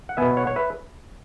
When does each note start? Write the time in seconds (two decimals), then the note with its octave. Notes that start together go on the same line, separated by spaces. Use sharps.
0.09 F#5
0.17 B2 B3 E5 G#5
0.37 C#5 F#5
0.47 C#5
0.56 B4 E5